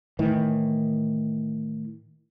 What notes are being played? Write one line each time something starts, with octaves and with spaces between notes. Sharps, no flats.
A2 D#3 E3